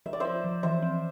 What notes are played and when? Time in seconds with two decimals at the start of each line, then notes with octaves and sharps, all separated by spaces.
0.06 F3 E5
0.13 D5
0.20 F4 C5 E5
0.44 F3
0.63 E3 C5 E5
0.83 C4